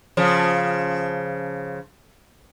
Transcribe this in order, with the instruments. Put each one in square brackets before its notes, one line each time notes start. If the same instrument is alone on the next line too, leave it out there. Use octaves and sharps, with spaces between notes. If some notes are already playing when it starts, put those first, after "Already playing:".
[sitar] C#3 F3